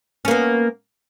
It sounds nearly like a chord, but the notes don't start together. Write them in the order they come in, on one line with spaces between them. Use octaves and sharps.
C#4 A#3 B3